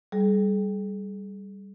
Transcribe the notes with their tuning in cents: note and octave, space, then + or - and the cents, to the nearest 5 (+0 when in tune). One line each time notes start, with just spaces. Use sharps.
G3 +0 G#4 +40